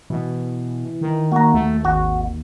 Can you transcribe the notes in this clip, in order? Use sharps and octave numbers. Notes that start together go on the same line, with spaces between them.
B2 E3
D#3
A#3 F#4 A#5
D#2 A3
G#1 F#4